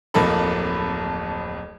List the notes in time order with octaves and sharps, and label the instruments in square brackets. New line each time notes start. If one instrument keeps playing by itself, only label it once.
[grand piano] D1 F2 A#3 D#4 A4 B5